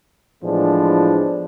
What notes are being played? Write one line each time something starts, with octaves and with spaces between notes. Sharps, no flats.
A2 E3 F3 G#3 B3 D4